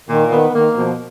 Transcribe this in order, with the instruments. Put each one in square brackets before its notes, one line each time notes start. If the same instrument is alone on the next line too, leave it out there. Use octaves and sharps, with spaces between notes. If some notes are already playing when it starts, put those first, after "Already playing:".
[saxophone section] A#2 [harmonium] D#3
[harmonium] D#3 [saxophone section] B3
[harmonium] D#3 [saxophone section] A#3
[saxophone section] B2 [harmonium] F3